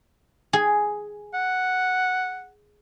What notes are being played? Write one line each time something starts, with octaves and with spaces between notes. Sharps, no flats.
G#4
F#5